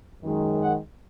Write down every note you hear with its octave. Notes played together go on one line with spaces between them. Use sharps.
F#2 D#3 G#3
F#5